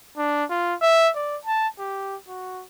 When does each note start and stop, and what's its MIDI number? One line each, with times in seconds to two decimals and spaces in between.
0.17 0.44 62
0.50 0.74 65
0.82 1.10 76
1.15 1.37 74
1.45 1.68 81
1.79 2.16 67
2.28 2.64 66